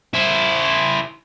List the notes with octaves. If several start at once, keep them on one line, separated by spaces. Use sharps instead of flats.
E4 C5